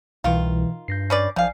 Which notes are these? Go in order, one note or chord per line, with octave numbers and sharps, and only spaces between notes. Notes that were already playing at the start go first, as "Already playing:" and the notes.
C2 B2 D#3 E3 F4
G2 G6 A#6 C7
C#4 B4 D5
A#1 D#3 F3 D5 F5 G#5